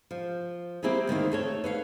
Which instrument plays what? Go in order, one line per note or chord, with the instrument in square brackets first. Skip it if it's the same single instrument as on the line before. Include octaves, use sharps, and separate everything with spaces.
[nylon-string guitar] F3
A#3 C4 E4 G4 G#4
D2 D#3 A#3 C4
A3 A4 C#5
B4 C#5 F5